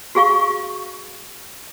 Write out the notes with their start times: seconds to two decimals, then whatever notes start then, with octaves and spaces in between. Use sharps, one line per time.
0.15 F#4 G#4 F5 C#6